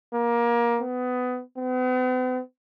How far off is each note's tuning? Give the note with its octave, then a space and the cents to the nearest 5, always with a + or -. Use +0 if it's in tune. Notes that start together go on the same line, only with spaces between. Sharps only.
A#3 +20
B3 +20
B3 +45